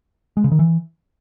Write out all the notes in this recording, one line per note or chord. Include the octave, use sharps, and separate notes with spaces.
G#3
C#3
D#3
E3